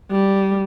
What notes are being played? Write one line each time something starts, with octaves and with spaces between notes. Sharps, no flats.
G3